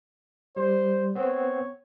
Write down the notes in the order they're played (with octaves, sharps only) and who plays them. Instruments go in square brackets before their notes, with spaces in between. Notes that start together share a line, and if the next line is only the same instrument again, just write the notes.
[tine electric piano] G3 [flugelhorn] C5
[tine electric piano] B3 C4 [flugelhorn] C#5